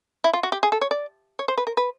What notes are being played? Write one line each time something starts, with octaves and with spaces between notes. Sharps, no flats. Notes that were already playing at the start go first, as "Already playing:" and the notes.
E4
F4
F#4
G4
G#4
A4
C#5
D5
C#5
C5
B4
A#4
B4